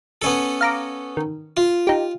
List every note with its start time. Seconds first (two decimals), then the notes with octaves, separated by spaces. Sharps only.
0.22 B3 C#4 A4
0.61 F5 A#5 D6
1.17 D#3
1.57 F4
1.87 D#4 G4